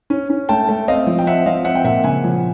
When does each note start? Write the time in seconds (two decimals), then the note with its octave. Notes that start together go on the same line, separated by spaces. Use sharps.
0.10 C#4
0.30 C#4
0.49 A3 G5 A5
0.69 A3
0.88 C4 D#5 F5
1.07 F3
1.19 G5
1.27 C4 E5 F#5
1.46 F3 D#5 F5
1.65 C4 E5 F#5
1.75 G5
1.84 A#2 E5 F#5
2.04 C#3 F#5 G#5
2.24 F3